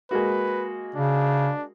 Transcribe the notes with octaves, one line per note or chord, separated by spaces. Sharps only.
G#3 A#3 F#4 B4
C#3 D4